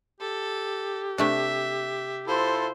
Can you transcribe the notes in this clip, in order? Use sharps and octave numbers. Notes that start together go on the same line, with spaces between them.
G4 A4
C3 A3 D4 E5
E4 F4 A4 C5